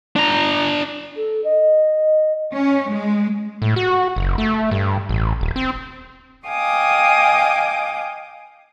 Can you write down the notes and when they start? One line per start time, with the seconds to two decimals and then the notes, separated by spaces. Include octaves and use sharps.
0.16 D4 A#5
1.16 A4
1.44 D#5
2.54 C#4
2.91 G#3
3.62 A2
3.76 F#4
4.16 F#1
4.38 A3
4.71 G2
5.09 A1
5.41 D#1
5.56 C4
6.47 D#5 F5 G5 G#5 D6 D#6